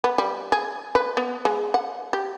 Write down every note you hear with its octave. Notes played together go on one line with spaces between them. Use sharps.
B3
G3
G#4
B4
B3
G#3
F#5
G4